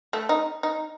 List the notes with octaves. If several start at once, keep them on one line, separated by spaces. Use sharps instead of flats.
A3
D#4
D#4